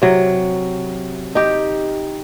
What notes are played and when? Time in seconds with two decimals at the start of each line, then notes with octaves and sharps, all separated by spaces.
0.02 C3 F#3
1.35 D#4 G4